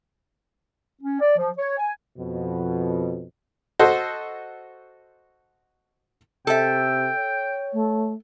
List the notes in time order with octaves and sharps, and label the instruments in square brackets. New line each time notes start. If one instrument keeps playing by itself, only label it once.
[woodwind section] C#4
D5
F3
C#5
G#5
[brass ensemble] F2 B2
[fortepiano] F#4 A4 C5 D#5
[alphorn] C3 [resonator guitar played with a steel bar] A4 E5 [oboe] G5
[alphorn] C#5
[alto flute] A3